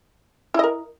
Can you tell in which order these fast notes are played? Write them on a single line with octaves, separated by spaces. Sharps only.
E4 D#5 A#4